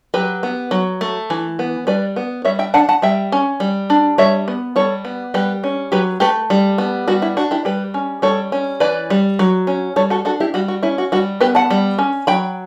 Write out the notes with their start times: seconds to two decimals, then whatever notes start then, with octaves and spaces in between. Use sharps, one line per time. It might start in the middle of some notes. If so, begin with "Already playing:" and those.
0.14 F#3 G4 B4
0.43 B3
0.71 F#3
1.01 A3
1.30 E3
1.59 B3
1.87 G3 B4 D5
2.16 B3
2.45 G3 C#5 E5
2.59 E5 G5
2.74 D4 F#5 A5
2.89 F#5 A5
3.02 G3 E5 G5
3.32 C#4
3.60 G3
3.90 D4
4.18 G3 C#5 E5
4.48 B3
4.76 G3 A4 C#5
5.05 B3
5.34 G3 G4 B4
5.64 C#4
5.92 F#3 G4 B4
6.20 A3 G4 B4
6.50 G3
6.78 B3
7.08 G3 F#4
7.22 E4
7.37 D4 F#4
7.51 E4 G4
7.65 G3 G4 B4
7.94 C#4
8.22 G3 A4 C#5
8.52 C#4
8.80 E3 B4 D5
9.10 G3
9.39 F#3
9.67 C#4
9.96 G3 A4 C#5
10.10 F#4 A4
10.25 D4 F#4 A4
10.40 E4 G4
10.54 G3 F#4
10.68 F#4
10.83 C#4 E4
10.98 F#4
11.12 G3 F#4
11.41 B3 G4 B4
11.55 F#5 A5
11.70 G3
11.99 C#4
12.27 F#3 G5 B5